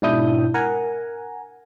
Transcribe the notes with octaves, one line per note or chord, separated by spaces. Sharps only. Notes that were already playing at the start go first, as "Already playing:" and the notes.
G#2 B2 D4 E4 D#6 G6
A#4 F#5 G#5 A#5